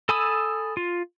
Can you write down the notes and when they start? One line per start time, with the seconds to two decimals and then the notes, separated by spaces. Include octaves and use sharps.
0.09 A4 G#5 B5 D#6 E6
0.77 F4